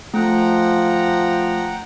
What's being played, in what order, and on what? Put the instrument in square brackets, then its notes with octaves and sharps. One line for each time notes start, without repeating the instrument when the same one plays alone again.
[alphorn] F3 [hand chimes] A3 [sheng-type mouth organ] F#5 G5 A#5